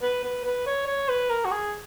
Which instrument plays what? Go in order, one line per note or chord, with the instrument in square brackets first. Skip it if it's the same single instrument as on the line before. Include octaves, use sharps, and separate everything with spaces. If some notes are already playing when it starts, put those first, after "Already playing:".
[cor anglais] B4
B4
B4
C#5
C#5
B4
A#4
F#4
G#4